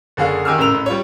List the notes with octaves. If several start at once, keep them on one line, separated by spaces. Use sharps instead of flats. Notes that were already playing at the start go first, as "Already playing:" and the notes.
F#1 D3 G#4 F5 C#6
D#3 G4 G#5 D6 E6 F6
A1 C#3 A#4 E6 F7
A1
G3 F4 C#5